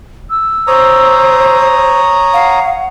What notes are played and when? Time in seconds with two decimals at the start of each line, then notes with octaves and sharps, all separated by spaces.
0.30 E6
0.67 C5 C#5 A#5 D#6
2.33 F5 F#5